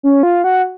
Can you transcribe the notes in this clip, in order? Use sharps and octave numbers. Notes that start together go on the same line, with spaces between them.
C#4
F4
F#4